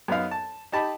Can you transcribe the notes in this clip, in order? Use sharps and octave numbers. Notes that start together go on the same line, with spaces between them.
F#2 B3 D#4 F5
A5
D#4 G4 A5 B5